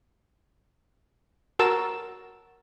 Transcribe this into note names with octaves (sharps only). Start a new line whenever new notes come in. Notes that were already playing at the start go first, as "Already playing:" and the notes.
F#4 A#4 A5 E6